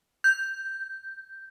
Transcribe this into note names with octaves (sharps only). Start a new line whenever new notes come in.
G6